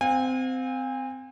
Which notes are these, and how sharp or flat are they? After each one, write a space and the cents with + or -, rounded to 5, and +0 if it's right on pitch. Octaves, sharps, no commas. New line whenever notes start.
C4 -20 F5 +40 G#5 -35